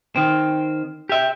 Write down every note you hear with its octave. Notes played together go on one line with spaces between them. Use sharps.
D#3 C4
G4 E5